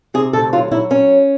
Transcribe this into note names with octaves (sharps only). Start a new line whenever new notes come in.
C3 G#4
D2 A4
F#3 F4
F#3 E4
C#4